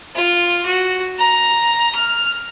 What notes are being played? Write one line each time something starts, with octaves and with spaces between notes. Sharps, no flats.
F4
F#4
A#5
F6